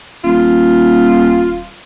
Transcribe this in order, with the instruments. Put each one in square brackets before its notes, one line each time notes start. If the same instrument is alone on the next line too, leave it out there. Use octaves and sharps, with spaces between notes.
[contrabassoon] D#1 [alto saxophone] F4